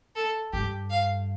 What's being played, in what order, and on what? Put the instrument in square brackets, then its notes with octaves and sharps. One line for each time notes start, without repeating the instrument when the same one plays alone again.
[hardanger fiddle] A4
[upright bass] G2 [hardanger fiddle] G4
[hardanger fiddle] F5